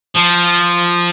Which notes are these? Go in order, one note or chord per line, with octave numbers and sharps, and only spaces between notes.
F3